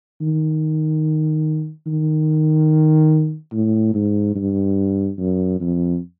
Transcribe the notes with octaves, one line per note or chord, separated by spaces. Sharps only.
D#3
D#3
A2
G#2
G2
F#2
F2